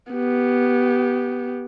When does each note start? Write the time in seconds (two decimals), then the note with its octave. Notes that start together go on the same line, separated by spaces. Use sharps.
0.13 B3 G4